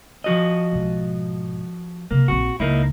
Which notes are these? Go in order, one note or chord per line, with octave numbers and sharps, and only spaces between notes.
F3 F#4 D#5
B1 G#2
C3 A#3 C#4
A#1 C4 F#4
C#2 A#3 D#4 E4